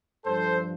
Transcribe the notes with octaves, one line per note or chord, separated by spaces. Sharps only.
G2 F3 A4 C5